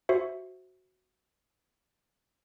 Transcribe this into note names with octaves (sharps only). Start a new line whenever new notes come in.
F#4 C5 E5